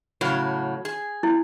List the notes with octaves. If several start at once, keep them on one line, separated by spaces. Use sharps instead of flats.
A2 C#3 F#3
G#4
E4